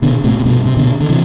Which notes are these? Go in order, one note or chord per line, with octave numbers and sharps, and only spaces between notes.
B2 D3
A2 C3
C3
G2 B2
C3
B2 D3
D3
C3 E3